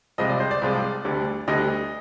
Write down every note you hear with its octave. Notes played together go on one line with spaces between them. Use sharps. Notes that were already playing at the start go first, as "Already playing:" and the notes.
C2 C3 F3 G#3 D#5
D5
C5
D5
C2 C3 F3 G#3
D2 D3 G3
D2 D3 G3 D#5